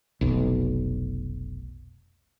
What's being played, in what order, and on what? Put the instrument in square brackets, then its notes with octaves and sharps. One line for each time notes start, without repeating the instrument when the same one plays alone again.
[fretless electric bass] F1 B1